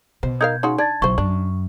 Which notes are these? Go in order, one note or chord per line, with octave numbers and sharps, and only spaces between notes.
B2 C5
D#4 A#4 F5 G6 G#6
C#3 D#4 F#4 C6
D4 A5 G#6 A6
B1 E4 C5 C#6
F#2 D4